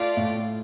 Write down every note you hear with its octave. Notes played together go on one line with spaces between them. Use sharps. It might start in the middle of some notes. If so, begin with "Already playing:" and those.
Already playing: A3 F4 D5
A2